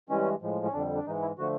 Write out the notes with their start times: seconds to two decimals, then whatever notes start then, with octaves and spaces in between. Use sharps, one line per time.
0.09 G2 E3 G#3 C#4
0.42 A2 F3 G#3
0.66 C#4
0.73 F2 D3 G3 D4
0.95 D4
1.06 G#2 E3 G#3 D#4
1.22 E4
1.38 D3 F3 A3 F#4